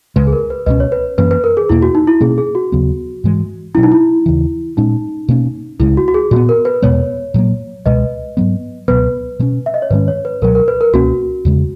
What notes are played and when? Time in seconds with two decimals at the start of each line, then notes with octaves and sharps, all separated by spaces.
0.16 C#2 C#3 G#3 B4
0.27 G#4
0.33 A#4
0.50 B4
0.66 C#2 B2 G#3 C#4 B4 D#5
0.80 C#5
0.92 B4
1.18 F#2 E3 A#3 C#4 B4
1.31 B4
1.44 A#4
1.57 G#4
1.69 E2 B2 A#3 E4
1.82 F#4
1.95 D#4
2.07 E4
2.21 B2 A#3 C#4 G#4
2.38 G#4
2.55 F#4
2.72 D#2 C#3 F#3 B3
3.24 G#2 E3 G#3
3.75 B2 F#3 C#4 E4
3.83 D#4
3.92 E4
4.26 D#2 C#3 E3
4.77 A#2 G#3 C#4 D#4
5.29 B2 A#3 C#4
5.80 C#2 C#3 G#3 E4
5.97 F#4
6.08 F#4
6.14 G#4
6.31 A#2 G#3 F#4
6.36 B3
6.49 A#4
6.65 B4
6.82 E2 B2 G#3 B3 C#5
7.34 A#2 F#3 A#3
7.86 C#2 B2 G#3 B4 D#5
8.37 G#2 F#3 B3
8.88 C#2 B2 F#3 B3 B4
9.39 B2 G#3 C#4
9.66 E5
9.74 D#5
9.82 C#5
9.90 G#2 D#3 G#3 C#4 B4
10.08 C#5
10.25 B4
10.42 C#2 B2 F#3 A#4
10.55 A#4
10.68 B4
10.81 A#4
10.93 C#2 B2 A#3 C#4 F#4
11.45 E2 C#3 G#3